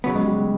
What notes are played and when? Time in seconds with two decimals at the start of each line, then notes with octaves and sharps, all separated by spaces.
0.04 C#3 F#3 B3
0.15 G#3
0.25 G3